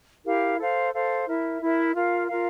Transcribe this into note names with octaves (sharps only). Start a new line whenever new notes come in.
E4 G4 A#4 F5
A4 C5 F5
A4 C5 F5
E4 A#4 E5
E4 A#4 E5
F4 A#4 F5
F4 A#4 F5